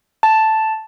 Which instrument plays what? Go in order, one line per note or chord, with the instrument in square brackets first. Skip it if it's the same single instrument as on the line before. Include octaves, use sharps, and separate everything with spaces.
[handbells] A5